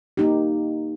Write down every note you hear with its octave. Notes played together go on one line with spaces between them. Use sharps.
A#3 D#4 G4